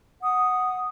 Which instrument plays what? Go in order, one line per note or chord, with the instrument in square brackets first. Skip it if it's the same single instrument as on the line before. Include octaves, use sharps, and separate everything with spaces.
[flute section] F#5 D#6